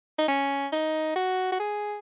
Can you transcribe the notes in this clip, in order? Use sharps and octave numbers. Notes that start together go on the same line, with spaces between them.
D#4
C#4
D#4
F#4
F#4
G#4